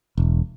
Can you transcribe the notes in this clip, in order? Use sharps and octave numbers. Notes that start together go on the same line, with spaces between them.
E1